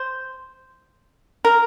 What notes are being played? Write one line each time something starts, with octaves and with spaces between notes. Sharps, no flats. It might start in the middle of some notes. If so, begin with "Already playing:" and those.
Already playing: C5
A#4